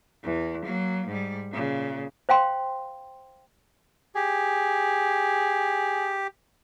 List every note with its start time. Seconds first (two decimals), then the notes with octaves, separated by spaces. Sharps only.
0.24 E2 E3
0.65 F#3 A#3
1.07 G#2 G3
1.52 A#2 C#3
2.29 C5 F5 G5 C6
4.15 G4 G#4